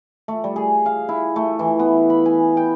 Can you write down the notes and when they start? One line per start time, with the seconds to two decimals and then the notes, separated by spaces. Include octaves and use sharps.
0.28 A3
0.44 G3
0.56 G#4
0.86 F5
1.09 E4
1.36 A3
1.59 E3
1.79 B3
2.10 B5
2.26 G#5
2.57 G5